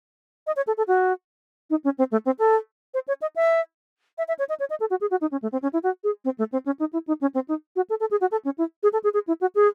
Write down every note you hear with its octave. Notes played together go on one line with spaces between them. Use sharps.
D#5
C#5
A4
A4
F#4
D#4
C#4
C4
A3
C4
A4
C5
C#5
D#5
E5
E5
E5
C#5
D#5
C#5
D#5
A4
F#4
G#4
F#4
D#4
C#4
A3
C4
C#4
E4
F#4
G#4
C4
A3
C4
C#4
D#4
E4
D#4
C#4
C4
D#4
F#4
A4
A4
G#4
F#4
A4
C#4
E4
G#4
A4
G#4
G#4
E4
F#4
G#4